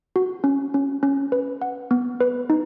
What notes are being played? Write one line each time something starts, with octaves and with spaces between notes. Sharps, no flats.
F#4
C#4
C#4
C#4
B4
F#5
B3
B4
D#4